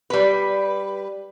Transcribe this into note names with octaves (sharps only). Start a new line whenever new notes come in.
G3 B4